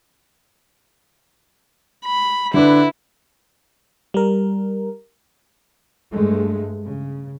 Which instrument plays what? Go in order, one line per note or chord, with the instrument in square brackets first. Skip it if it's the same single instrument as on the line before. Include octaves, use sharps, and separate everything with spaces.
[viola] B5
[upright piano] D3 D4 B4 [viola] E4
[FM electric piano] G3 A#4
[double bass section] G2 G#3 A3
C#3